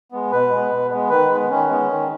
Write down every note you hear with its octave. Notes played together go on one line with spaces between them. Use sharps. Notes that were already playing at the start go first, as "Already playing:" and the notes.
G#3 B3
B2 B4
G#3 B3
B2
G#3 B3
D#3 B4
G#3
B3
D#3 C#4
G#3 B3
D#3